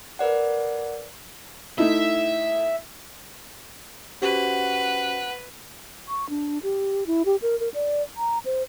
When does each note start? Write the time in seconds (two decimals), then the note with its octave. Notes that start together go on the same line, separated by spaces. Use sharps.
0.19 A#4 B4 D5 F#5
1.79 A3 D#4 E4 E5
4.22 C#4 F#4 G4 B4 C5 F#5
6.08 C#6
6.30 D4
6.63 G4
7.07 E4
7.26 G4
7.42 A#4
7.60 A#4
7.74 D5
8.17 A#5
8.46 C5